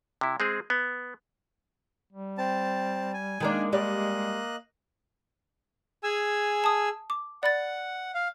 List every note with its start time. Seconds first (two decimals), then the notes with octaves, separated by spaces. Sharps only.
0.21 C3 E4
0.40 G#3 C4 G#4
0.70 B3
2.13 G3
2.38 C4 A5
3.14 G#5
3.40 D#3 G#3 A#3 D4
3.72 G3 A#3 D5 D#5 F#6
6.03 G#4 G#5 E6
6.64 A5 D#6
7.10 D6
7.43 D5 F#5 B5 A6
8.14 F5